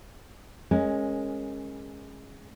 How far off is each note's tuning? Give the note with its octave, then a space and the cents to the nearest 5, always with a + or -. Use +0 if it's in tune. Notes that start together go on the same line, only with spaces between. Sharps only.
G#3 +0 C#4 -15 A#4 +0